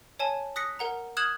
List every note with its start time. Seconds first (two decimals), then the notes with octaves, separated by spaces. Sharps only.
0.19 C#5 G#5 A5
0.56 D#6 F#6 A#6 B6 C#7
0.79 A#4 F#5 A#5
1.17 D#6 F6 F#6 G#6 E7 F#7